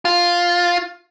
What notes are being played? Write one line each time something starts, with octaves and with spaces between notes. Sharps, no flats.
F4